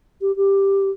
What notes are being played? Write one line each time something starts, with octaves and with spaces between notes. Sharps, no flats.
G4
G4